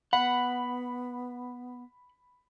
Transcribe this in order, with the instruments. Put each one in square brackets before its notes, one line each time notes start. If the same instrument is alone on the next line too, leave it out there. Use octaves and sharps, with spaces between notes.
[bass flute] B3 [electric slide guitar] F#5 [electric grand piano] B5